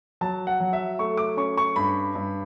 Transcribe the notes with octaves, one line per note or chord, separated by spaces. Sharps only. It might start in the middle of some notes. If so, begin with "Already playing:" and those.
F#3 A5
F#5
F#3
E5
A3 C#6
D6
C#4 C#6
C#6
G2 B5
G2